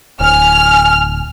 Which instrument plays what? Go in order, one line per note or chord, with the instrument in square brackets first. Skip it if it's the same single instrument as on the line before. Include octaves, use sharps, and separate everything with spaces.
[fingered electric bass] D1 [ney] G#5 [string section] F6